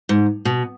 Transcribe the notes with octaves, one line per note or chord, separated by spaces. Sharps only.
G#2
B2